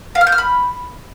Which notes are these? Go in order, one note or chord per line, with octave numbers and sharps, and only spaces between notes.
F5
F6
G6
F6
B5